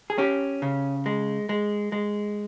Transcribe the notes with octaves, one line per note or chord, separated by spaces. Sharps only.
G#4
C#4 G4
C#3
G#3
G#3
G#3